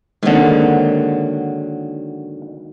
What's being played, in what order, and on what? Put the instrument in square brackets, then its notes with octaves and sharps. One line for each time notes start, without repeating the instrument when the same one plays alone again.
[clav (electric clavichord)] G#2 D3 [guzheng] D#3 F#3 [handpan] G#3 A#3 C4